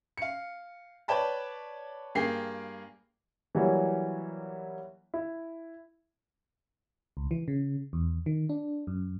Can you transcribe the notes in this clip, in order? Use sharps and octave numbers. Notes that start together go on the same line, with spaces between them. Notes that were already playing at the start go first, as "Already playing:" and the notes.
F5 C#7
B4 C#5 D5 G5 A5 B5
G2 A#3 G#4 G5 C7
E3 F#3 G3 A#3 E4
E4
C#2
E3
C#3
E2
D#3
D4
F#2